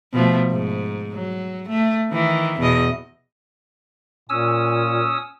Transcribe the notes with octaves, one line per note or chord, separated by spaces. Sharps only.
B2 F3 A3
G#2
F#3
A3
D#3 E3
E2 B2 D#5
A#2 C#4 D#6 E6